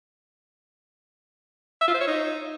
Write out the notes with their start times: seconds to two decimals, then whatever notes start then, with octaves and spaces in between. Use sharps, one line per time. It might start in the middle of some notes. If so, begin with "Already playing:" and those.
1.81 E5
1.88 F4
1.94 C5
2.01 C#5
2.07 D#4